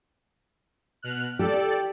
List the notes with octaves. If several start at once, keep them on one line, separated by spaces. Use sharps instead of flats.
B2 F6 F#6
G4 A4 D5